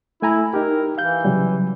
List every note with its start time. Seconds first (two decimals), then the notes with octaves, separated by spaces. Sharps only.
0.22 A3 E4 G#5 A#5
0.54 D#4 G4 A#4
0.98 E3 F5 G6
1.25 C#3 F#3 G3